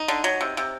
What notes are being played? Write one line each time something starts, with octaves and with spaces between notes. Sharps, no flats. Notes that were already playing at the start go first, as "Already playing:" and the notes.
Already playing: D#4
D3
F#3
C3
C3